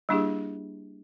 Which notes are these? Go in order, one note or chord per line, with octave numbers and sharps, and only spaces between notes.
G3 A#3 D4 E4 G4 G#4